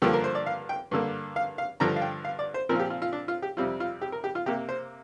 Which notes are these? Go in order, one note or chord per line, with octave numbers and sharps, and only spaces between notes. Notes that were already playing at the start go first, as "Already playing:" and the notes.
G2 D3 F3 A#3 G4
A#4
C5
D5
F5
G5
G2 D3 A#3
F5
F5
G2 D3 F3 A#5
F5
G5
F5
D5
C5
A#2 F3 C4 A#4
F4
G4
F4
F4
D4
F4
G4
F2 C3 G3 C4 F4
F4
G4
A#4
G4
F4
C3 A#3 G4
C5